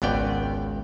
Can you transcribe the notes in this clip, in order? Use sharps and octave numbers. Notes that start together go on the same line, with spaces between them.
G#1 C#2 B3 D5 G5